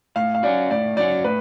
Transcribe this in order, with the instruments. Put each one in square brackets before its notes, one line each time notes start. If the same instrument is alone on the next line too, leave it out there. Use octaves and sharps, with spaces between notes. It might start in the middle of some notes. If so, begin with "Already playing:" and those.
[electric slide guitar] A2 [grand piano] F5
[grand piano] F5
[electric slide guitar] F#3 C#4 F#4 [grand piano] D5
[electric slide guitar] A2 [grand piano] D5
[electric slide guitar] F#3 C#4 F#4 [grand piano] D5
[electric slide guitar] A2 [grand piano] B4